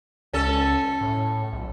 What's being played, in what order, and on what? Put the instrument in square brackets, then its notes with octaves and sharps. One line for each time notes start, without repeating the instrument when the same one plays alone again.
[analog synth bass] C#2 [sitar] C#4 A4
[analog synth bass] A2
B1